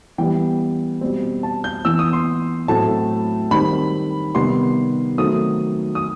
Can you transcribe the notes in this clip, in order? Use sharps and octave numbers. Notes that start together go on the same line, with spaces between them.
E3 G3 B3 G5
B2 G3 C4
A5
G6
E3 B3 E6
D#6
C6
A2 F#3 A3 C4 A5
D#3 G3 C4 B5
C3 D#3 G3 B3 C6
D#3 F#3 A3 C4 D#6
D#6